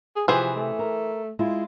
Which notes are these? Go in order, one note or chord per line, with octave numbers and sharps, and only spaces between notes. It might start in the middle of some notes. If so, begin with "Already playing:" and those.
G#4
C3 E3 F3 G4 G#4 B4 C5
A3
A#4
G#3 E4 F4